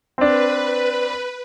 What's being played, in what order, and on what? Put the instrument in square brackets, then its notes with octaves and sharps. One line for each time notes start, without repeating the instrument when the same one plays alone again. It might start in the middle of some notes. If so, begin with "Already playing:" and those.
[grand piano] C4 D4 [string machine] B4